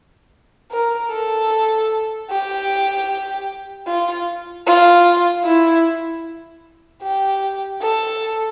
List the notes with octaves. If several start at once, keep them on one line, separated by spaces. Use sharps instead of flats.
A#4
A4
G4
F4
F4
E4
G4
A4